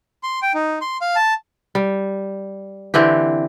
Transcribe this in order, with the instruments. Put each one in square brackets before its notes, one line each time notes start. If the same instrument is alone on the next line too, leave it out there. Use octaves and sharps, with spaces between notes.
[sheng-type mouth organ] C6
G5
D#4
C6
F5
A5
[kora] G3
D3 E3 C4 G4